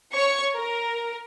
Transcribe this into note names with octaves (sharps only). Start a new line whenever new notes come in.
C#5 C#6
A#4